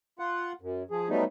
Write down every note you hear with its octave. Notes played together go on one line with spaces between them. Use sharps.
F4 F#5
F#2
F3 G#4
F#3 G3 A3 B3 D#4